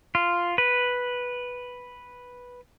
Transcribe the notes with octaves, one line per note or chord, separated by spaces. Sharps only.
F4
B4